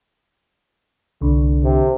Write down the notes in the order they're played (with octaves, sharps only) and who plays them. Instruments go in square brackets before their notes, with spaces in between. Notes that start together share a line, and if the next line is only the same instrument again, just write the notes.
[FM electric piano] C2 [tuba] D3
[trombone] C3